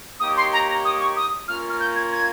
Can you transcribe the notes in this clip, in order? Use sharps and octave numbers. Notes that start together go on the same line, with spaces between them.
A#3 D#4 G4 C#5 D#6
C6
A#5
A#5
D#6
C#6
D#6
A#3 C#4 F4 F6
F6
G6
G#6
G#6